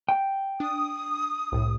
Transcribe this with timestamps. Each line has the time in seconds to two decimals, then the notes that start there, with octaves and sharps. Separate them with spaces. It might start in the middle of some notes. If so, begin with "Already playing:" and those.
0.09 G5
0.60 D4 D#6
1.52 C2 A2